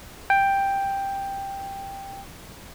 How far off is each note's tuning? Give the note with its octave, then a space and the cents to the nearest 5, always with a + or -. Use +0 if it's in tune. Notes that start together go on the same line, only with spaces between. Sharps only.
G5 +5